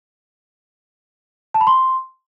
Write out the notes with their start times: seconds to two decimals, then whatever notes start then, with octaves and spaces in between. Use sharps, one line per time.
1.54 A5
1.61 B5
1.67 C6